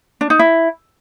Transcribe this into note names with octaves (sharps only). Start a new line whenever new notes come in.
D4
D#4
E4